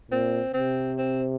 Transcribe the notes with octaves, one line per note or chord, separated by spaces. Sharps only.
A#2 C4
C3 C4
C4